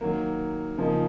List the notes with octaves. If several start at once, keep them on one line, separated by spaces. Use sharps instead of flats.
D#3 F#3 A#3
C#3 F3 A#3 D#4